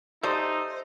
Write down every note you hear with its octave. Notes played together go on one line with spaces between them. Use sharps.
D#4 G4 A4 C5 D5 E5 C6 D#6